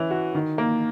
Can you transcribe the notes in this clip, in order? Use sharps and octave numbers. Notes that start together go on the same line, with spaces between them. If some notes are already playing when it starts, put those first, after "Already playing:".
Already playing: E3 C#4
F#4
D#3
A#3